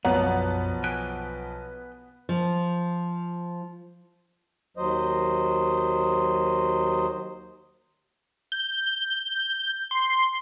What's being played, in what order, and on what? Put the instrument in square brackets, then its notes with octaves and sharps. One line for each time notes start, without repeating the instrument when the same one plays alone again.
[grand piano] B1 F3 F#5 [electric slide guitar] F#2 D5 [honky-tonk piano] B3 [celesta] C#5 A#5
[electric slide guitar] B4 G5 G#5
[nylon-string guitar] F3
[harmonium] D#2 F#3 C5 D#5
[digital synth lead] G6
C6